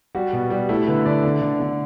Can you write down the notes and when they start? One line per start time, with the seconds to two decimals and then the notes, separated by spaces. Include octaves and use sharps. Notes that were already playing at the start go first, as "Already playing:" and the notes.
0.15 G3 F#4
0.33 B2
0.50 G3
0.69 A3 E4
0.87 D3 B4
1.06 D3 D5
1.23 D3
1.41 D3
1.60 D3